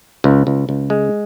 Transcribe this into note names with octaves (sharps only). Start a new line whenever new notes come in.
C#2
C#2
C#2
G#3